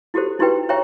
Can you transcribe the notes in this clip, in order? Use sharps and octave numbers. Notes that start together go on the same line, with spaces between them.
E4 F#4 G4 A4 C5
D#4 E4 F#4 G4 B4 G5
C5 C#5 E5 G5 A#5 C#6